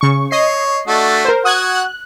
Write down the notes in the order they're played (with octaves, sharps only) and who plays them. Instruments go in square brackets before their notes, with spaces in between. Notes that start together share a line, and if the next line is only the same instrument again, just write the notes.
[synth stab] C#3 C#6
[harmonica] C#5 [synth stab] D#5 C7
[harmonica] A3 D4 F#4
[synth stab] A#4 C5
[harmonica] F#4 F#5 [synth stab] D#6 F#6 G#6
[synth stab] F#6